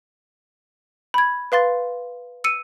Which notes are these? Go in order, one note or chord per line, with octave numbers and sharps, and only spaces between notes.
B5 G#6
B4 F5 C6 A6
E6 C#7 D#7